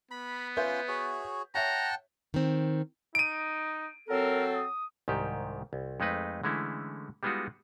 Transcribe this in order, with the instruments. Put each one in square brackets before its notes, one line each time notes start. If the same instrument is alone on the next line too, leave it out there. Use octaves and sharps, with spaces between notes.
[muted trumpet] B3 [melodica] B5
[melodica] C#4 F4 C6 [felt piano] B4 E5 G6
[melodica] F#4 G#4 C#5
[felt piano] C#5 E5 [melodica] F#5 G5 A5 [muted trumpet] A#5
[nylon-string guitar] D#3 C4
[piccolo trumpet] D#4 [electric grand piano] D7 D#7
[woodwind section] F#3 C4 A4 [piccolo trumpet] A#4
[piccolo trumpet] D#6
[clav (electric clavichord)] C2 G#2 D#3 G4
C2
F2 G#3 A3 D#4 B4
D3 E3 G#3 A3 C#4 E4
G3 G#3 B3 D#4 F4 F#4